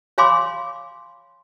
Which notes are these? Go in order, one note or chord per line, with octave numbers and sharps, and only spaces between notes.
C#5 F5 G#5 B5 C6 D6